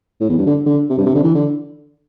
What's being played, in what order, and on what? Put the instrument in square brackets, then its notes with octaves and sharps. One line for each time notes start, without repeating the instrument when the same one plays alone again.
[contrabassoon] A2
E2
G2
D3
D3
C3
G2
C3
D3
E3
D3